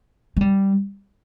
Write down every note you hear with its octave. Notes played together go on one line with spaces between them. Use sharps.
G#3
G3